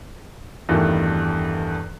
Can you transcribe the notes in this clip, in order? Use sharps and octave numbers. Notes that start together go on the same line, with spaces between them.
E2 G2 D#3 E3 A3